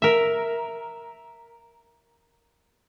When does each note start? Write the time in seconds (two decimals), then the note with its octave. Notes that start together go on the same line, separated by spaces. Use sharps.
0.02 A#4 E5